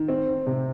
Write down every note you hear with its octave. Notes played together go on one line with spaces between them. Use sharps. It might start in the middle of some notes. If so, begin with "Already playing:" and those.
Already playing: D#3
C4
D#3
C3